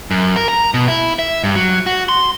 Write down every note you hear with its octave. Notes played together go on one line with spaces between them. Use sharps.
F#2
A#4
A#5
B2
E4
E5
G2
F#3
F#4
C6